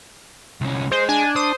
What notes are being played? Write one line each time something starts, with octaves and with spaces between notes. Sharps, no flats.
C2 C#4
G#4 C5 D#5
D4 G#5
C5 D#6